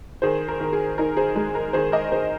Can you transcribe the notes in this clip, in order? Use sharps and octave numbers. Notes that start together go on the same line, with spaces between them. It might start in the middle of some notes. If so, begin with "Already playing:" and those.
D#3 G#4 C5
A#4
D#3
G#4
D#4 A#4
G#4 C5
G#3
A#4
D#3 G#4 C5
A#4 D#5
D#3 G#4 C5